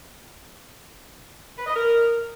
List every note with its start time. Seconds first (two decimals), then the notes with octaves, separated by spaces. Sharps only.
1.58 B4
1.66 D#5
1.75 A#4